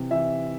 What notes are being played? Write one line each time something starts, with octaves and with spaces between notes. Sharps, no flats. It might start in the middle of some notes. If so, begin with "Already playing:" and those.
Already playing: C3 E3
E3 E5